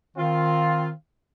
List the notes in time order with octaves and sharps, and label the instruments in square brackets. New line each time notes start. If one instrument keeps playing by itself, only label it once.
[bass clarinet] D#3 [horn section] C4 F4